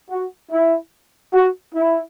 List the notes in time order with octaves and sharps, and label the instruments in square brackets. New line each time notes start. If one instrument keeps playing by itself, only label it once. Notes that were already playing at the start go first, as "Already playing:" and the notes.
[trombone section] F#4
E4
F#4
E4